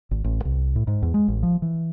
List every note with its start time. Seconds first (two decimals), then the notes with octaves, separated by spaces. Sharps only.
0.11 G#1
0.24 A1
0.45 C2
0.76 A2
0.87 G#2
1.02 E2
1.14 G#3
1.28 A1
1.43 F3
1.62 E3